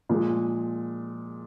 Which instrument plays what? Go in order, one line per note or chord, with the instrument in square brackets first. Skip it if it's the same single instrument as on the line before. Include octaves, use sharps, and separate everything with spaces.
[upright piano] A#2 F3 G#3